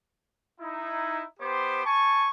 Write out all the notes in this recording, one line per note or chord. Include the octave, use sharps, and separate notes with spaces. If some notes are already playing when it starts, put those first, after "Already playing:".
D#4 E4
B3 G4 C5 C6 D6
G#5 A5 C#6